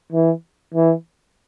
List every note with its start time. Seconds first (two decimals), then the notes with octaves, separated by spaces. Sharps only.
0.12 E3
0.74 E3